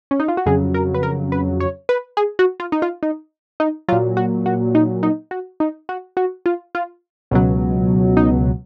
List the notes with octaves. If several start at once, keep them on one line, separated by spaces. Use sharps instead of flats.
C#4
D#4
F4
F#4
F2 C#3 F#3 G#4
A#4
B4
A#4
B4
C#5
B4
G#4
F#4
F4
D#4
F4
D#4
D#4
A#2 F#3 F4
F#4
F#4
D#4
D#4
F#4
D#4
F#4
F#4
F4
F4
C#2 B2 F#3
D#4